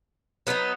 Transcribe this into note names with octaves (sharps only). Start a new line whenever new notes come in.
F#3 B3 D#4